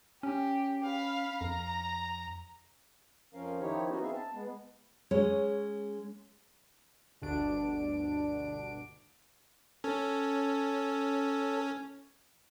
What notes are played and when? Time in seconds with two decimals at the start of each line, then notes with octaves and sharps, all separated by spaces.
0.23 C#4 G4
0.84 F5 B5
1.41 F2 A#5
3.34 F2 F3 C#4 A#4 F5
3.60 D#3 F3 D#4 E4 G4 C#5
3.89 B3 C#4 D#4 F#4
4.02 B3 C4 G#4 E5 F5
4.14 A5
4.33 G#3 B3
5.11 G#3 C#4 C#5
7.22 G1 D2 B2 D4 D7
9.84 C#4 A4